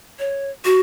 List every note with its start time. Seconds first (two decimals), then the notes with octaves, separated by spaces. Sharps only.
0.19 C#5
0.65 F#4